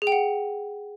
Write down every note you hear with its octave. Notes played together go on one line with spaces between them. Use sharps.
G#4
G5
F#5